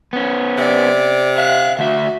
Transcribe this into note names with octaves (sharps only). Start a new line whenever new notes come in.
B3 C#4
C3 D5
E5 F5 F#6
D2 F#4 E5